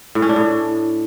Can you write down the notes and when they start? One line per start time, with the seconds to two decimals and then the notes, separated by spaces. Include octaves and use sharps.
0.15 A2
0.22 C#4
0.29 D4
0.36 A2